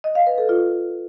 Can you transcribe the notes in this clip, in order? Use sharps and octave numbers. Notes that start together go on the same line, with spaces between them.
D#5
F5
B4
A4
F4